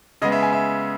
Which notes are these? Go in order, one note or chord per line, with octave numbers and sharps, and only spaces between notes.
C#3 G#3 B3 D#5
E5
G#5
E5